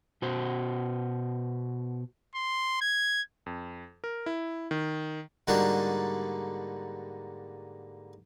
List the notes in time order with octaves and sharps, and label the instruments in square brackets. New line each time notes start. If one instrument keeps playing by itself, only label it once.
[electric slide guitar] B2 F#4 C5
[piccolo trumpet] C6
G#6
[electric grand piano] F2
A#4
E4
D#3
[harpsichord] G#2 D3 G3 A#3 D4 F#4